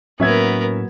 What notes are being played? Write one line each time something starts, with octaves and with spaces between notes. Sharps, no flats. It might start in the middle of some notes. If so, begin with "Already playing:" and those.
A2 F#3 A#3 B3 C#4 A#4 E5 G#6